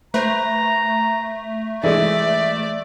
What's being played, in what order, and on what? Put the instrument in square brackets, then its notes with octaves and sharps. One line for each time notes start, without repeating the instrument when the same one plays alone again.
[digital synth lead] A3 [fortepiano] B4 C5 [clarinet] A#5
[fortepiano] E3 G#3 [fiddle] D5 [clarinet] E5